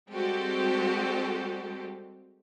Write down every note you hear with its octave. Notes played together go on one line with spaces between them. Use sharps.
G3 G#3 C4 F#4 G4 A4